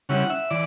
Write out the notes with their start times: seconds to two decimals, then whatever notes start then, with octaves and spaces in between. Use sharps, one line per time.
0.09 C#3 G3 C#4 E4 F#5
0.30 E5
0.50 E3 D5